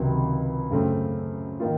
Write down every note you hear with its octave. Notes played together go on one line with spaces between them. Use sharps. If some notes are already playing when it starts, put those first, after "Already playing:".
Already playing: C#2 C3 D#3 F#3
F#2 C#3 A3 C4
D#3 A#3 F4